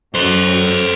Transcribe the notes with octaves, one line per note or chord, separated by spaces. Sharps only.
F#2 F#3 A4 C5